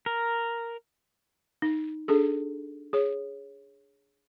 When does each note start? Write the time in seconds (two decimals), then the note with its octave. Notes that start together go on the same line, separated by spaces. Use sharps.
0.06 A#4
1.62 D#4
2.08 D4 G#4 A4
2.93 G#4 C#5